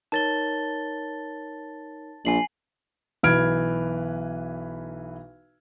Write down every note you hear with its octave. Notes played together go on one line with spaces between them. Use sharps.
D#4 A#4 C#5 A5 A6 G7
A#1 G#5 C7 F#7
B1 E3 B4 F6 G#6 D7